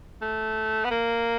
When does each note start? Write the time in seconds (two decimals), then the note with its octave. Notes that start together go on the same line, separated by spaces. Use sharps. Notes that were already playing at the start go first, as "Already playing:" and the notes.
0.22 A3
0.84 B3
0.91 A#3